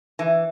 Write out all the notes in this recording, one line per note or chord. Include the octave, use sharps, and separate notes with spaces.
E3